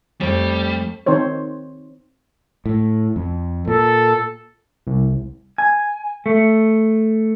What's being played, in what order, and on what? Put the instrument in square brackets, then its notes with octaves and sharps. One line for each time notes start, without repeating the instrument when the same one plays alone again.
[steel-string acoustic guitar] F2 A3 [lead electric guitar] G3
[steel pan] D#3 C4 D#4 C5 C#5
[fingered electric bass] A2
F2
[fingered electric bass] A#2 [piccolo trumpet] A4
[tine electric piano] C2
[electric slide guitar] G#5
A3